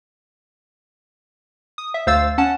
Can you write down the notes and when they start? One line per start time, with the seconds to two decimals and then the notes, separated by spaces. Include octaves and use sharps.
1.78 D#6
1.94 E5
2.07 D2 C5 F5 E6 A6
2.38 C#4 F#5 A5